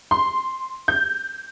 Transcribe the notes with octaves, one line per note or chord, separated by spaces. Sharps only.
C6
G6